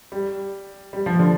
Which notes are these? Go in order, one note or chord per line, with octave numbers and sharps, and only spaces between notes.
G3
G3
F3
D3